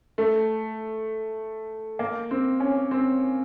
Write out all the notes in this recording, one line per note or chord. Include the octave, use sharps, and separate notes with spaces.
A3
A#3
C4
C#4
C4